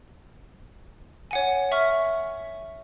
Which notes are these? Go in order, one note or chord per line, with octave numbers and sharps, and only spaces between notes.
C#5 F#5 G#5
E5 C#6 F6